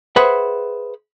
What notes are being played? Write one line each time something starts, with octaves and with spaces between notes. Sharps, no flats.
G#4 B4 C5 E5 F#5